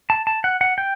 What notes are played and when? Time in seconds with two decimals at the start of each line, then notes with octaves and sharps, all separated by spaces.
0.10 A5
0.27 A5
0.44 F#5
0.61 F#5
0.78 G5